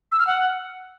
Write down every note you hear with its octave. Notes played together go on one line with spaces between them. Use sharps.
E6
F6
F#5